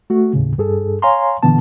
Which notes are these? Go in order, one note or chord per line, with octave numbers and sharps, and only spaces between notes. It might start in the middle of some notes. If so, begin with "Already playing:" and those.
A3 F#4
D#2 A2 C#3
G2 G#4 A4
C#5 F5 G#5 A#5 C6
A#2 D3 E3 B3 A5